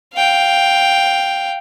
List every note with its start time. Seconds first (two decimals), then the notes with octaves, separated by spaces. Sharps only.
0.14 F5 G5